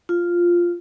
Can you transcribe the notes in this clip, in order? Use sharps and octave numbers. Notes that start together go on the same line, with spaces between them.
F4